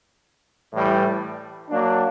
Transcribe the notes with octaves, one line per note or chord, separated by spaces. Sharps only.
A2 E3 G3
F#3 A#3 D4